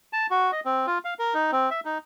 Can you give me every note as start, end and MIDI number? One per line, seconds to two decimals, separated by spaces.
0.13 0.27 81
0.30 0.51 66
0.52 0.60 75
0.65 0.86 60
0.87 0.98 65
1.05 1.14 77
1.19 1.34 70
1.34 1.51 63
1.52 1.70 60
1.71 1.80 76
1.85 1.98 63